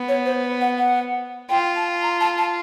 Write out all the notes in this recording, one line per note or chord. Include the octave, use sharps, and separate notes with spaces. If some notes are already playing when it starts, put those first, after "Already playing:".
Already playing: B3
C#5
C5
F#5
F#5
F4 G5
A5
A#5
A5
A5